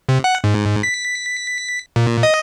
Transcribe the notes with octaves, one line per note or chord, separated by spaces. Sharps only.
C3
F#5
G#2
B6
A#2
D#5